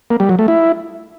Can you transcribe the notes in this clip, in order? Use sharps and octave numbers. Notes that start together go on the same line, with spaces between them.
A#3
G3
F#3
A3
E4